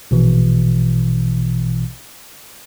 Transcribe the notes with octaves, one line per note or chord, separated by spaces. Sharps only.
A#1 B2 E3